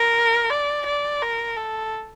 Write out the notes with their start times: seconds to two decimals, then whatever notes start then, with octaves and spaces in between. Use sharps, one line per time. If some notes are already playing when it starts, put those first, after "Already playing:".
Already playing: A#4
0.50 D5
0.86 D5
1.22 A#4
1.57 A4